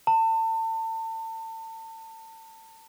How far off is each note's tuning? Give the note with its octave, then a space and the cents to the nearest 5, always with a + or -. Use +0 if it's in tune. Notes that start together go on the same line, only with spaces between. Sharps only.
A5 +35